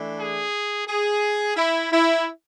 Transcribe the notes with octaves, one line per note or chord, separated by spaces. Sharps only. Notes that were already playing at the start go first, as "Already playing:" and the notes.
Already playing: E3 A3 D4
G#4
G#4
E4
E4